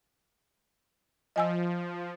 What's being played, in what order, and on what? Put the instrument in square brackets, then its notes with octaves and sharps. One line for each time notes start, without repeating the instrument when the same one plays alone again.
[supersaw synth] F3 [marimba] D#5 G#5 E6